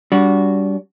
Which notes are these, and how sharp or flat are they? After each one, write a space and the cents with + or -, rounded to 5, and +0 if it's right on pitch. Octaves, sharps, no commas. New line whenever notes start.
G3 +0 D4 -35 F#4 +0